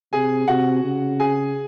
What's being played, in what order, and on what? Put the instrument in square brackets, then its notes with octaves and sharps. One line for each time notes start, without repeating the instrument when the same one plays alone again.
[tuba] C3 [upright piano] G#4 G#5
[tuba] C3 [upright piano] F#4 F#5
[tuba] C#3
[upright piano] G#4 G#5